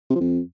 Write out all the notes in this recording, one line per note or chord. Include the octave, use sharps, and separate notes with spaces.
C3
F3
F2